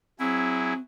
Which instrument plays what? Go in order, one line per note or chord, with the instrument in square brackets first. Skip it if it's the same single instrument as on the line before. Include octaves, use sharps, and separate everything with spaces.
[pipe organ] F#3 E4 G#4 [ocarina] C4